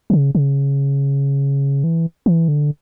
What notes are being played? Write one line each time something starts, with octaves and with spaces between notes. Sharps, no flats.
D3
C#3
C#3
E3
E3
D3